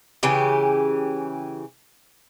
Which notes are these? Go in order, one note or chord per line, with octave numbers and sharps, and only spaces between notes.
C#3 E3 G4